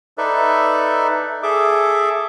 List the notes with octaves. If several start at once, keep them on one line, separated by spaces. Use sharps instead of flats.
D#4 A4 B4 D5 E5
G#4 A4 E5 D6